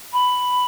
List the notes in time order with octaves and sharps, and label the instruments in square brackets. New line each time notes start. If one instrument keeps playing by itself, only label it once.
[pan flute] B5